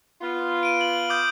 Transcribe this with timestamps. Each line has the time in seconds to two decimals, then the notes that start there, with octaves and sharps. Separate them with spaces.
0.21 B3 F4
0.63 D7 D#7
0.81 F#7
1.10 D6 D#6 G6